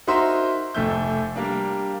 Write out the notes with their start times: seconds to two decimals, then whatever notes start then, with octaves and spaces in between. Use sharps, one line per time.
0.07 D#4 F#4 A#4 C5 E5 C6
0.74 F1 F2 A3 E5 G6
1.36 G3 A#3 D4